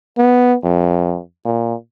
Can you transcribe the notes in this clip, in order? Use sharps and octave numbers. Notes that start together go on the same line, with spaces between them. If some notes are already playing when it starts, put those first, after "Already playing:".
B3
F2
A#2